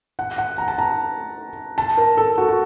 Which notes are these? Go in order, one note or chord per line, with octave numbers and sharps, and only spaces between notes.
F#5
F#5
A#5
A5
A#5
A5
A#4
A4
F#4
F#4